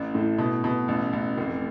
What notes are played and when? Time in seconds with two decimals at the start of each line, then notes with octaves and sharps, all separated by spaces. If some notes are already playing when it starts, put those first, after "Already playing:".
Already playing: A1
0.15 A2
0.38 B2
0.64 B2
0.88 A1
1.13 A1
1.38 F1